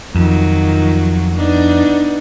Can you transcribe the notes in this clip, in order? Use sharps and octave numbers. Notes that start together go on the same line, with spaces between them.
F2 D#3 F3 F#3
B3 D4 D#4